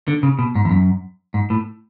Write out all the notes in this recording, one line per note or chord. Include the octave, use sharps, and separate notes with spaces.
D3
C#3
B2
G#2
E2
F#2
G#2
A2